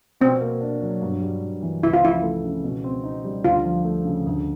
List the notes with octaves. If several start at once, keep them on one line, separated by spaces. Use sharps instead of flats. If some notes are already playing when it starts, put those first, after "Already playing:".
B2 C4
A#3
D4
F#3
G2
G3
G2
E3
C#2 E4
F4
F3 E4
A3
C#3
B2
C4
D#4
G3
D2 F4
F3
A3
C#3
D2